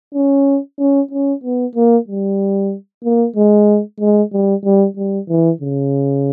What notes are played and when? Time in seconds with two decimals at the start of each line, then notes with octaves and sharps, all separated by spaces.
0.14 C#4
0.79 C#4
1.11 C#4
1.43 B3
1.75 A#3
2.08 G3
3.04 A#3
3.36 G#3
4.00 G#3
4.32 G3
4.64 G3
4.97 G3
5.29 E3
5.61 C#3